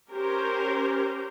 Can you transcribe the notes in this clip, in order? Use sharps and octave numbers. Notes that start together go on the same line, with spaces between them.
C#4 G4 A#4 C5